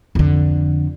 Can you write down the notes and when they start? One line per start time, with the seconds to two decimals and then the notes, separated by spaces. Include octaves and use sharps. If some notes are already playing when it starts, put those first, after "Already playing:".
0.15 F2 D3